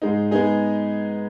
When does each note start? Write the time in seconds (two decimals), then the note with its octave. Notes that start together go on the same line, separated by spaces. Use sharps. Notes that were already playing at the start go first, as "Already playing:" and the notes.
0.02 G#2 G#3 D#4
0.31 G#3 B3 D#4 G#4